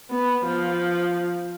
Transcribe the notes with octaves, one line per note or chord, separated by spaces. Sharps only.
B3
F3